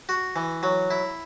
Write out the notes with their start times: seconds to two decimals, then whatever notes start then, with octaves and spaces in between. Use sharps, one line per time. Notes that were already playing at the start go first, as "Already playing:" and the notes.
0.09 F#4
0.36 E3
0.63 F#3
0.91 E4